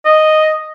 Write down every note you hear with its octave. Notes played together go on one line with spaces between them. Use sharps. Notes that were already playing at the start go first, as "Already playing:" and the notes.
D#5